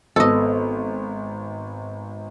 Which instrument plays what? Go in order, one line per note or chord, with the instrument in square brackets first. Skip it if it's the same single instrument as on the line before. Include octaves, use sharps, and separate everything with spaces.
[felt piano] G#1 B3 [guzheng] A4 D#5